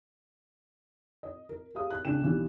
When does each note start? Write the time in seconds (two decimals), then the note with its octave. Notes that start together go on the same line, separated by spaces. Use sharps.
1.23 D#5
1.49 A#4
1.75 G4 G#4 F5 D#6
1.90 F#6
2.05 C#2 D4 G5 E7
2.21 B1 E3 G3